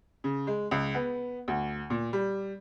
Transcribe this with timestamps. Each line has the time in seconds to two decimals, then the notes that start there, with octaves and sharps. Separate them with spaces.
0.24 C#3
0.47 G#3
0.71 C#2
0.95 B3
1.48 D2
1.90 A#2
2.13 G3